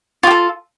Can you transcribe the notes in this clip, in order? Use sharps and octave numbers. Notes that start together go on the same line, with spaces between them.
F4 G4 A4